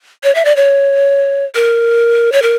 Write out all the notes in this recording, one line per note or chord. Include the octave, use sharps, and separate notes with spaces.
C#5
E5
D5
C#5
A#4
C#5
A#4